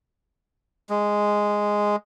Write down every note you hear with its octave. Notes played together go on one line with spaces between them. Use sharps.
G#3